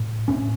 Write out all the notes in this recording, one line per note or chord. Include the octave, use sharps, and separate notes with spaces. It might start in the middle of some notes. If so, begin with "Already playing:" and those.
Already playing: A2
A2 C#4